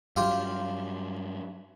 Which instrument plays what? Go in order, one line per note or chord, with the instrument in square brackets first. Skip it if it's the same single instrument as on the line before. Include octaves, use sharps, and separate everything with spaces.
[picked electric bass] G2 F#3 [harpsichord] F4 G4 F5